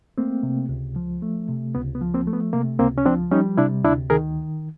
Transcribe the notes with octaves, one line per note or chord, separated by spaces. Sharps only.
A3 A#3 C4
C3
C#2
F3
A3
C3
C#2 B3
B3
F3
A#3 C4
A3
B3
C3 A#3
C#2 A#3 C4
C#4
F3 C4 D4
G3 C#4 D#4
C3 D4 E4
D2 D4 E4
D#3 G#4 A#4